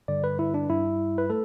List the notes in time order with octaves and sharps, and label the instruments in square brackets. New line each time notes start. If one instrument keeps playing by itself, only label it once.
[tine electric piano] G2 D3 G3 D5
B4
E4
D4
G2 G3 E4
B4
A3 A4